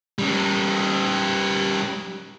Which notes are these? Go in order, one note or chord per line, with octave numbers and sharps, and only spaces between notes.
G3 C#4